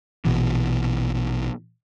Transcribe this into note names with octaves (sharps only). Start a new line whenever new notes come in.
A#1 B2 E3